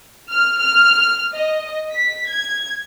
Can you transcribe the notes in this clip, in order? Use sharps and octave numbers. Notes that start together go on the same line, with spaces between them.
F6
F6
D#5
B6
G#6